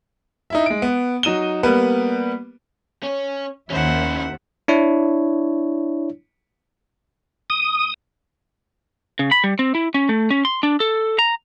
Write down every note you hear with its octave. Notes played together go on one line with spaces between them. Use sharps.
D#4 E4 E5
G#3 D7
B3
F#3 D#4 D#7 E7 G7
G3 A#3 B3 B4
C#4 C#5
D#2 C#4 E4 C5 E5 F#5
D4 E4 C#5
D#6
C#3
B5
G3
C4
E4
C#4
A3
C#4
C6
D4
A4
A#5